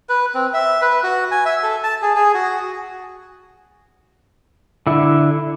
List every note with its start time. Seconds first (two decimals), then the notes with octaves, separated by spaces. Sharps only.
0.09 B4
0.34 C4
0.54 E5
0.82 B4
1.03 F#4
1.31 G#5
1.45 E5
1.63 A4
1.84 A5
2.02 G#4
2.15 G#4
2.34 F#4
4.87 D3 E4